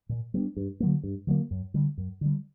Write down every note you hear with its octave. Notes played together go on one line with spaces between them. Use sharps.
A#2
G3 B3 D4
G2
D3 F#3 A#3
G2
D3 F#3 A#3
F#2
D3 G3
F#2
D3 G3